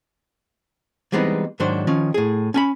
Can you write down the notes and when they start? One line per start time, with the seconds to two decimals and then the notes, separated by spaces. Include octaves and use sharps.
1.12 E3 G3 G#3 B3 C4 D#4
1.60 G#2 D#3 F#3 D4 C5
1.87 D#3 F3 C#4
2.14 A2 G#4
2.54 C#4 G#5 B5